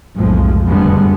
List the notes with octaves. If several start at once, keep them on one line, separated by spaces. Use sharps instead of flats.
B1 F2 A2 F3 G#3
F#1 D2 D3 G3 G#3 B3